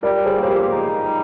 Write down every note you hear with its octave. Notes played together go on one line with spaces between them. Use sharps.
G3 A#4 D5
G#4 C5
A#3
C5
G4 A#4
D#4
G3